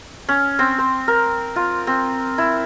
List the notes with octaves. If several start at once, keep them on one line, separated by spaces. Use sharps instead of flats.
C#4
C4
C5
A#4
F4
C4
E4